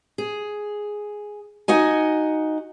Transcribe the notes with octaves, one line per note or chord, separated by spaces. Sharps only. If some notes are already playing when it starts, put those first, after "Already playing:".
G#4
D#4 F#4 D#5 G#5